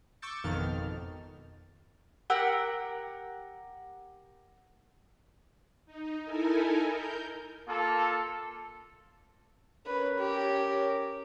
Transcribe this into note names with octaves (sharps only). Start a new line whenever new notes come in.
C#6 D6 E6 G6 A6 C#7
G#1 F2 B2 D#3 F6 A6
G4 A#4 F#5 E6
D#4
D#4 E4 A4 A#4 G#5
A#4 G6
A#3 F4 A4
C#4 A#4 B4 C#5
G4